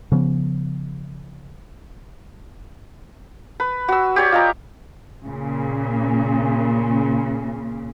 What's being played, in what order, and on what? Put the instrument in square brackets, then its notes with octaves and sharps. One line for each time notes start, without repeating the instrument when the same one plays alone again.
[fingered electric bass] C#3 F3 B3
[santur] B4
F#4 E6
G4 C#5 D5
F4 D#5 A#5
[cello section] A#2 C#3